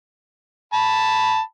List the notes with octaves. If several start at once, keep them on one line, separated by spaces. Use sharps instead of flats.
A5 B5